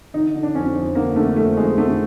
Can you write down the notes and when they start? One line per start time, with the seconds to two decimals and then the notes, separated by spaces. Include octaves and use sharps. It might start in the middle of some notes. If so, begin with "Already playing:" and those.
0.14 D3 D#4
0.34 D3
0.43 D4
0.55 F2 C#4
0.75 F2
0.95 D3 A#3
1.16 D3 A3
1.36 F2 A3
1.57 F2 G#3
1.78 D3 A3